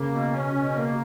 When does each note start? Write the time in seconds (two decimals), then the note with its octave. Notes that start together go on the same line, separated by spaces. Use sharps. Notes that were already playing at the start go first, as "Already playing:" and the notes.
Already playing: C#3 A#3
0.11 B2
0.33 C#4
0.55 B2
0.76 A#3